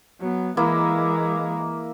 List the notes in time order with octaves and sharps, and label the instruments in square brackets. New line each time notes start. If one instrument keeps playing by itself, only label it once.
[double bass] F#3 B3
[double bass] E3 G#3 [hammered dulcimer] A#3 E4